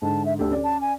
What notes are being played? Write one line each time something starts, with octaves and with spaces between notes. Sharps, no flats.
G#2 D3 A5
E5
D2 D4 G4 A4
C#4 D5
A5
G#5